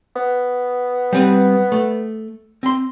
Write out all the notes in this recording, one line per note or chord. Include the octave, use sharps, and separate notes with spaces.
B3
G3 C4 B4
A3
C4 C6